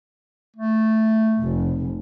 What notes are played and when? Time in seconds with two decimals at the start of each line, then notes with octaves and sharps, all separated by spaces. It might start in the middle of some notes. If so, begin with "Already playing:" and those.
0.56 A3
1.40 F1